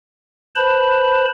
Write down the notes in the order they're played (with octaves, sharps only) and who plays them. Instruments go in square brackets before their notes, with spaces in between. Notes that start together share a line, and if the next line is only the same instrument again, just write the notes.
[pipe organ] B4 C5 A5 B5